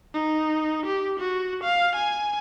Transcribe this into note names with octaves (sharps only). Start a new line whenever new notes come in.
D#4
G4
F#4
F5
G#5